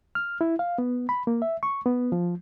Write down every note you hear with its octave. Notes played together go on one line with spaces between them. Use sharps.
F6
E4
F5
B3
B5
A#3
E5
C#6
B3
F3